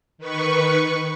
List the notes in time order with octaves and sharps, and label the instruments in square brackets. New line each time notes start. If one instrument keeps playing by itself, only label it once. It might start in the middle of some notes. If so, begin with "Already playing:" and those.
[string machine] D#3 B4 C#6